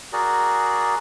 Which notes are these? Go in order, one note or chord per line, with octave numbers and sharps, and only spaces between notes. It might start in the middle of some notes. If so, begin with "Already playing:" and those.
F#4 G#4 A#4 D5